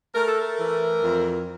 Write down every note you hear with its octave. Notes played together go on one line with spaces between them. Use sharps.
A3 A#4
A4
A#4
E3
F2